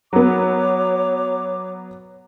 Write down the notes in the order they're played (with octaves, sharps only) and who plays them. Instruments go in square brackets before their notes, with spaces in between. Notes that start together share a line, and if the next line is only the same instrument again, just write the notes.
[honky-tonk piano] F#3 B3 [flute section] C#5 D6